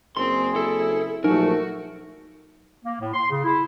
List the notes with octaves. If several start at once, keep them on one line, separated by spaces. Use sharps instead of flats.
F#1 C4 G#4 C6
E4 A4
A#1 F#3 A3 D#4 F#4 A#4
A#3
A2
C6
C#3
E4